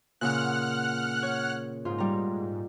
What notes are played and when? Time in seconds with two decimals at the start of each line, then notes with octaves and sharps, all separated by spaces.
0.21 A#2 C#3 F#5 F6 F#6
1.23 C#5
1.85 G#2 F4
1.98 G3 A#5